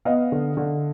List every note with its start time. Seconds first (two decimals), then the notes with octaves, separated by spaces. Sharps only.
0.05 B3 D#5 F5
0.32 D3
0.57 D3